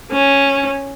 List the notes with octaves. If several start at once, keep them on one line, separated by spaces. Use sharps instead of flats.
C#4